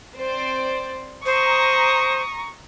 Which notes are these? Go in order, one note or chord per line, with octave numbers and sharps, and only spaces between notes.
C4 C5 D5
C5 A#5 C#6 D#6